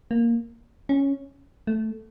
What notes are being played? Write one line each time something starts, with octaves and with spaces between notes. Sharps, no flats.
A#3
C#4
A3